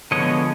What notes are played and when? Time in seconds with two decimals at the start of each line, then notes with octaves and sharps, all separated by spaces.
0.11 D3 F3 G#3 B3 C#5 D#5